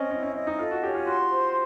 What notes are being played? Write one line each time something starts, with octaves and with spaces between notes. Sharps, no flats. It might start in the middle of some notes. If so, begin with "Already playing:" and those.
Already playing: C4 C#4 D#5
C#4 E4
C#4
C#4 D#5
D#4
F4 A4
F#4
C#4 G4
F4
F#4 C6
C5